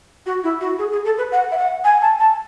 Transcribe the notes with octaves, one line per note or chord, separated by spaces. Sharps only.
F#4
E4
F#4
G#4
G#4
A4
B4
F#5
E5
F#5
G#5
A5
A5